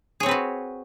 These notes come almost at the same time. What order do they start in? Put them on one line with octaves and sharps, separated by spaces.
G#4 C#5 C4 B4 F#4